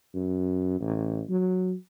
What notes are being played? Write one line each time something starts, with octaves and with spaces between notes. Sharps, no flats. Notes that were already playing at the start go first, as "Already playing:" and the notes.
F#2
A1
F#3